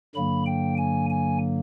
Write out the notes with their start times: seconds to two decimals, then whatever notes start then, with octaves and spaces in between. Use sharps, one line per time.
0.15 G2 D3 F#3 A#3 B5
0.46 G5
0.77 G#5
1.10 G#5